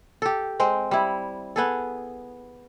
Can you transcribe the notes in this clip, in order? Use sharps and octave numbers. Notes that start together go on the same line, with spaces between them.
G4 A4
G#3 C4 C5
G3 E4
B3 G#4 A4